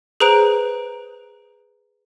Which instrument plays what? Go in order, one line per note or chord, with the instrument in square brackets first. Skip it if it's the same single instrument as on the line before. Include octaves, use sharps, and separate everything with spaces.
[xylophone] G#4 B4 C5 A#5 F#6 D7